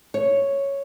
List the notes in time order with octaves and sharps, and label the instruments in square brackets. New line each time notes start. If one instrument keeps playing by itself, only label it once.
[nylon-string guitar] C#5